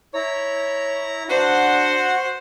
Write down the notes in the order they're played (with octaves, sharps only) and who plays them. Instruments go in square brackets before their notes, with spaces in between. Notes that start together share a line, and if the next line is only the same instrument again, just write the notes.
[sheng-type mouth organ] E4 A#5 [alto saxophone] C#5
[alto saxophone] D4 [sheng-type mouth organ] F#4 F#5 [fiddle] C5